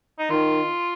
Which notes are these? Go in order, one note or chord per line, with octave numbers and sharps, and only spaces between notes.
D#4
D#3 F4